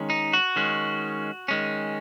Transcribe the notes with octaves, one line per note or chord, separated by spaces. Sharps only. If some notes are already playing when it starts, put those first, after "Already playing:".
Already playing: D#3 G#3 C#4
D#4
F#4
D#3 G#3 C#4
D#3 G#3 C#4